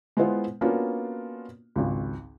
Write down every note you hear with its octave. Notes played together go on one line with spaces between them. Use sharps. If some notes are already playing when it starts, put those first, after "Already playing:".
G#3 B3 E4 F4 C5 F#5
A#3 B3 C#4 D4 F4 F#4
G#1 C#2